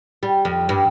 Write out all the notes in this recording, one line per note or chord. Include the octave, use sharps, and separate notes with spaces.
G3
F2
G2